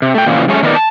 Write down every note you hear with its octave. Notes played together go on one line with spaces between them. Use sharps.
C3
A3 G5
A#2 C#3 E3 F3
F#2 G#3 A3 C#4 C#5
D#3 A3 B3 A#4 D5
A5